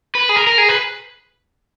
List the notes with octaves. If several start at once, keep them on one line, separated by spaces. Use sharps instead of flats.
B4
G#4
A#4
A#4
G#4
B4